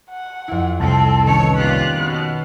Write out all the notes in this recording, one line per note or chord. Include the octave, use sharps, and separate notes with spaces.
F#5
F2 E4
C2 C4 A4
D#3 B3 C#4 C#5
A#2 F4 G4 F#6
B2